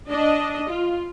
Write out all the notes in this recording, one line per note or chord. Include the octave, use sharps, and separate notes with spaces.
D4 D#5
F4